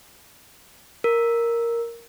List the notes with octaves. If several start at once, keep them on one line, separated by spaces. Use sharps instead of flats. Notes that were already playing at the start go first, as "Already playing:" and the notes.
A#4